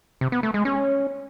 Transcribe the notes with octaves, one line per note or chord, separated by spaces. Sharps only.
C3
B3
A3
G#3
C#4